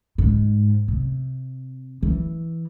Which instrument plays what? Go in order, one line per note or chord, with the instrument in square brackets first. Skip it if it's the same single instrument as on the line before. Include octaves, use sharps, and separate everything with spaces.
[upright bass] G#2
C3
E3